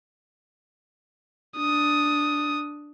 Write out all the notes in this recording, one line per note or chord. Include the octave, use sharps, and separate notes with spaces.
D4 D#6